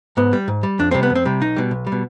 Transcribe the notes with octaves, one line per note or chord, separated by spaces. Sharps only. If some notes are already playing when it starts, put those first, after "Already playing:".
G#2 B3
G3
G#2
G3
F2 D4
C3 G3 C4
B3
F2
C4
C3 G3
B1 D#4
B2 G3
B1
G3
B2